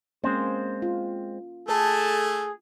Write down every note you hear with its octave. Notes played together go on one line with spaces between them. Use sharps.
G#3 A#3 C4 C#4 C5
F4
A3 G#4 A4 G#5 A5